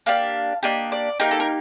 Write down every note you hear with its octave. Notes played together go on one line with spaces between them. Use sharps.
A#3 D4 G4 F5
A#3 D4 G4 D#5
D5
A#3 D#4 G4 A#4
A4
A#4